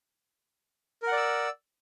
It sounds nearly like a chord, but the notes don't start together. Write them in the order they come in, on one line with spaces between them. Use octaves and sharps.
A#4 F#5 D5 E6